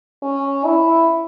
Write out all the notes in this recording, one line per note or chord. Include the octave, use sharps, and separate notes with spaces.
C#4
E4